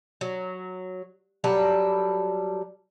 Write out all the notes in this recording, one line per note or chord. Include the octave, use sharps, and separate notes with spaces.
F#3
F#3 G3 A4 B4